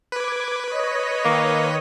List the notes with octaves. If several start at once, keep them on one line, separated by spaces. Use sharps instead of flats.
B4 D6 G#6
C#5 D#5
D#3 A#3